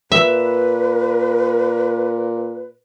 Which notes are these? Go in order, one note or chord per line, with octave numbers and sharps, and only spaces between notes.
A#2 B4 E5